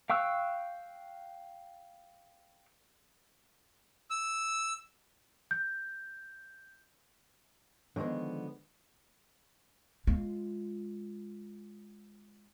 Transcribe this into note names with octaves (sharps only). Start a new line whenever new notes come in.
F5 G5 C#6 E6 F#6
E6
G6
D3 D#3 F3 G#3 B3
G#3 F4